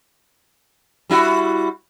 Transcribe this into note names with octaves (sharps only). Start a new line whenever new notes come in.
G3 E4 F#4